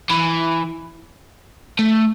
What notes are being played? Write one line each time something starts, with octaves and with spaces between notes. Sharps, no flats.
E3
A3